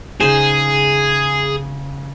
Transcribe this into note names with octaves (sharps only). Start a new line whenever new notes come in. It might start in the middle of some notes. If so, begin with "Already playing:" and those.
C#3 D#4 G#4 C5